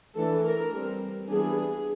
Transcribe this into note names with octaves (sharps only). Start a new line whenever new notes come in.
E3 A3 D4 A4
A#4
G3 C4
E3 G3 B3 D4 G#4